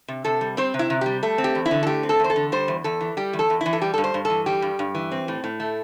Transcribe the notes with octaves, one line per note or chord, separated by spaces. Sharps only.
C3
C3 A4
G3
C4 C5
C3
E4
C3
G3 G4
A3 A4
C4
G4
E2
E4
D3
A4
A3 G4
C4
A4
E2 C5
A4
D3
G3 C5
E2
E2 A4
E3
G3 G4
E2
A4
E2
E3 E4
A4
G3 G4
A4
G2
C5
G2
A4
E3
G3 G4
G2
G2
E3
C4
A2
A2
A3